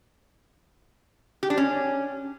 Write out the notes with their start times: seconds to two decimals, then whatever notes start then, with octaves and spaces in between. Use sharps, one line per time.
1.43 G4
1.50 D4
1.57 C#4